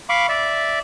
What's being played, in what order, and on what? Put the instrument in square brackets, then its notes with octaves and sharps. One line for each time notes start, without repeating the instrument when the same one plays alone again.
[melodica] F5 B5 C#6 D6
D5 E5